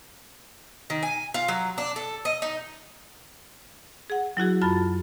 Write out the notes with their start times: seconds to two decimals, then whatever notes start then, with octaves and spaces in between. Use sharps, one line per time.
0.90 D#3
1.03 G#5
1.34 F4
1.48 F#3
1.78 D4
1.96 A4
2.25 D#5
2.42 D#4
4.10 G#4 F#5
4.37 F#3 E4 F#4 G#4
4.62 F#2 F4 A5 B5 A6